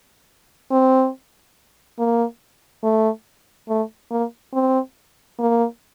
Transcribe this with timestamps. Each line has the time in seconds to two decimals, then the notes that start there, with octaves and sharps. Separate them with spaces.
0.71 C4
1.99 A#3
2.84 A3
3.69 A3
4.11 A#3
4.54 C4
5.39 A#3